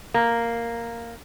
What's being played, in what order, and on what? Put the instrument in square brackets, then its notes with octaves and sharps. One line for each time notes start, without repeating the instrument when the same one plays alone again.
[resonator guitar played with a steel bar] A#3